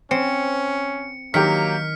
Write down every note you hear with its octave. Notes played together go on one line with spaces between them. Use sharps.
C4 C#4 C#7
D#3 F#3 A#3 G4 F6 B6 C#7